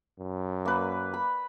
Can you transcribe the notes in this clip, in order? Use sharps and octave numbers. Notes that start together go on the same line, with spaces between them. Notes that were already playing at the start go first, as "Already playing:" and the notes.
F#2
A#3 B4
B5